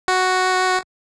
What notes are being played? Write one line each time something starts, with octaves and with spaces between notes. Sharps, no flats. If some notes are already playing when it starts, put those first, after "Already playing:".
F#4